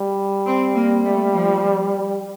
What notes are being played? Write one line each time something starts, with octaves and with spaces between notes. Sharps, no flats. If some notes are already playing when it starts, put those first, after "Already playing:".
Already playing: G3
C4
A#3
A3
F3